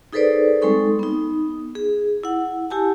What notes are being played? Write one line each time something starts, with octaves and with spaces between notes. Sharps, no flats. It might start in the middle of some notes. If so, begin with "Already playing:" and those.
D#4 G#4 A4 B4 C5 D5
G3 G#3 C4 D#4 A4 C#6
B3 D#4
G#4
E4 F#5
E4 G4 G#5 A5